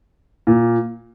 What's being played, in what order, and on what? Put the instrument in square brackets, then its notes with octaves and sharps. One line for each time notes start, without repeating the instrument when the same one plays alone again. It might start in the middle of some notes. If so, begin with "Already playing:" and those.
[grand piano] A#2